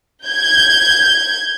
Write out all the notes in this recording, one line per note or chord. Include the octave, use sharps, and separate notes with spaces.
G6 G#6